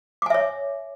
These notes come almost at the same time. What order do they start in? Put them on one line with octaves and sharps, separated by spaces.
D6 G#5 E5 C#5